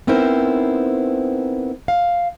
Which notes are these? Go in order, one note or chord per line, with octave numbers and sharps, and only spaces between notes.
B3 C4 D#4 E4 A#4 C5
F5